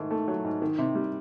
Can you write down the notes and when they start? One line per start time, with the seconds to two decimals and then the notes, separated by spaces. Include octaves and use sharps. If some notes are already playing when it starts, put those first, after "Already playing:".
Already playing: G#2 D#3 A3
0.11 A3
0.28 F#3
0.45 G#2
0.62 D#3
0.78 C3
0.95 G3